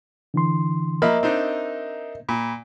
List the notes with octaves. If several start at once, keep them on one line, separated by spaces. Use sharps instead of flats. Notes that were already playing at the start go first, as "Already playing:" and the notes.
D3 E3 C6
F3 A#3 A#4 D#5 E5 B5
C4 D4 D#4
A#2 B5